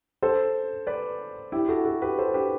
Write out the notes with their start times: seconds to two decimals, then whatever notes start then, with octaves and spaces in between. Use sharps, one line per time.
0.23 A4 C5
0.87 B4 D5
1.52 E4 G4
1.68 F#4 A4
1.85 F#4 A4
2.02 G4 B4
2.18 A4 C5
2.34 G4 B4